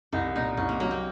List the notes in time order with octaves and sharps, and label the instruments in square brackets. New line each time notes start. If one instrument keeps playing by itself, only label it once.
[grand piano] C2 [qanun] D#4
[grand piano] A#2 [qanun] D#4
[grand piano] C2 [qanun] C#4
[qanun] A#3
[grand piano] F#3 [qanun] A#3
[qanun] C4